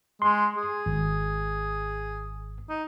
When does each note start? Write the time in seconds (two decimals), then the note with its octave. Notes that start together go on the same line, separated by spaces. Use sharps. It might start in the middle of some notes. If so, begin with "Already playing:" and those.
0.22 G#3 C6
0.57 G#4
0.86 G#1
2.69 D#4